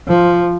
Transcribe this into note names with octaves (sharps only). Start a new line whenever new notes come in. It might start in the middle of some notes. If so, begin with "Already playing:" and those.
F3